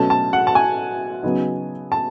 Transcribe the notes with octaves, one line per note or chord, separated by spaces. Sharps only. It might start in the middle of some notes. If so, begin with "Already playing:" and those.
Already playing: B2 F#3 A3 C#4 A5
A5
F#5
A5
G#5
C#3 F#3 B3 D#4
A5